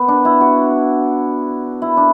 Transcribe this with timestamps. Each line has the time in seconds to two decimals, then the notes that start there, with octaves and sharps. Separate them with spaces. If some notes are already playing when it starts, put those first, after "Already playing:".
Already playing: B3
0.08 D4
0.25 E4
0.41 F#4
1.82 E4
1.97 D4